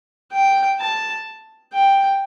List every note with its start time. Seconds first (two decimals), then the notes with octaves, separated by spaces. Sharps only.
0.32 G5
0.80 A5
1.73 G5